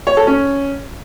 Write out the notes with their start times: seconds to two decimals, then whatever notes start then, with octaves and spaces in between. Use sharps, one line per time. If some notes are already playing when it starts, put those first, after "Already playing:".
0.07 C#5
0.17 A4
0.27 C#4